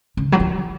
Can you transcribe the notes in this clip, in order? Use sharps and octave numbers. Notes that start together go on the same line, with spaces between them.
C#3
F#3
E3